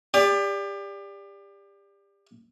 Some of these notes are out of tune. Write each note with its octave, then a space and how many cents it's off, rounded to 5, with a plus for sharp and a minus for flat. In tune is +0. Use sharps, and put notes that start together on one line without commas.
G4 +30 D5 -10